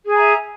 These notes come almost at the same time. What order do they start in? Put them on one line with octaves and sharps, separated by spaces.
G#4 G#5 A#5 E5